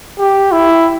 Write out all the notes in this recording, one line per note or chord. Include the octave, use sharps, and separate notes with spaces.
G4
E4